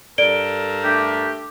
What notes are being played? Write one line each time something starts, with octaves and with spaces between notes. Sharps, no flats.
G2 A4 A#4 D5 D7 G7
A3 D4 G4